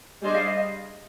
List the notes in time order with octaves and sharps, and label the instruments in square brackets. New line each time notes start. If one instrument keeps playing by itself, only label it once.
[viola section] G3 D4 G#4 C5 [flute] D#5
[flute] F5
D#5